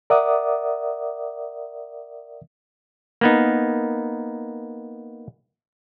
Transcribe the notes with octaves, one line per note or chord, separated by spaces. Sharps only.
A#4 D5 E5 F#5 D6 D#6
A#3 B3 D#4